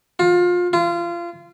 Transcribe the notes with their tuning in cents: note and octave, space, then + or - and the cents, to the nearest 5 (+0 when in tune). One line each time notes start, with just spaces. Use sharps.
F4 +25
F4 -25